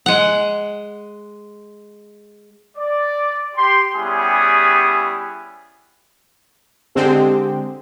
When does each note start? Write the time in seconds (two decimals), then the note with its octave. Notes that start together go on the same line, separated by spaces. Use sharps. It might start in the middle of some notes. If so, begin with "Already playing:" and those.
0.06 G#3 F#5
2.78 D5
3.55 G4 C6
3.94 G3 B3 C#4 E4 G4 G#4
6.96 D3 G#3 C4 G4